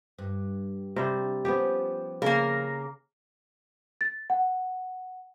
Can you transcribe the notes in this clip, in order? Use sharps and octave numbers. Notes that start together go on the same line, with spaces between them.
G2
C3 G3 C5
F3 B3 C#4 G4
C#3 A#3 A#4
A6
F#5